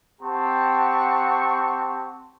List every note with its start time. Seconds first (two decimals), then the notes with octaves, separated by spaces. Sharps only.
0.21 C4 G4 F#5 A5 C#6